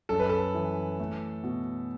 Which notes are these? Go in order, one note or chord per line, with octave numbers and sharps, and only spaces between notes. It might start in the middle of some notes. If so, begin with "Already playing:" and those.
F#2 A4
B4
A4
E3
A3
B2